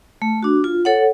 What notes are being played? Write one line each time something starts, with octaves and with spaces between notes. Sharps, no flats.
A3
D4 F#4
F4
A4 C#5 F#5